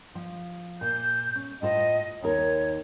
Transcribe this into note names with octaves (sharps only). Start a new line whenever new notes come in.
F3
A#2 G6
C#4
A2 F4 C5 D#5
D#2 D#4 A#4 C#5